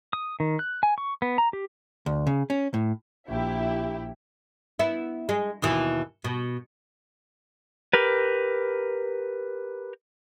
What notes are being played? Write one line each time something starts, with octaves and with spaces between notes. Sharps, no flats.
D#6
D#3
F#6
G#5
C#6
B3
A#5
G4
D2
C#3
C#4
A2
A#1 E4 G4 E5
B3 E4
G#3
D#2 B2 E3
B2
G4 A#4 B4